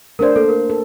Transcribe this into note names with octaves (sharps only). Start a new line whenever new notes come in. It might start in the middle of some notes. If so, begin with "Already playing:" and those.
A3 D4 A#4 C5 D5
A#3 A4
A#4
A4